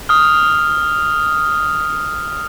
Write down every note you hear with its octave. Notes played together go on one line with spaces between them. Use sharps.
D#6 F6